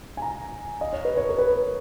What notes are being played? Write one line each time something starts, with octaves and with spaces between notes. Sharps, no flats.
G#5
A#5
D#5
C#5
B4
C#5
A#4
B4